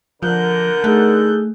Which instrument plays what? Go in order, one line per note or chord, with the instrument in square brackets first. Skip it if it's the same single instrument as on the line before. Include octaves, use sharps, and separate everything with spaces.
[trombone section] D3 A#4 [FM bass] F3 [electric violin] F#6 G6
[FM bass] A3 [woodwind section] D#4 G#4 A4